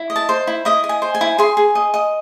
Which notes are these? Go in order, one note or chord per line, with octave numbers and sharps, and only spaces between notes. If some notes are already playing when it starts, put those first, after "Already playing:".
Already playing: E4
D#5
A5
C5
E4
E4 D#5
D#5
G#5
C5
G#5
E4
G#4 C6
G#4
D#5
D#5